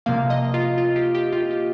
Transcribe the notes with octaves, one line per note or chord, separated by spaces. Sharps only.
C3 F3 A#3 F5
D#5
F4
F4
G4
G4
F4
G4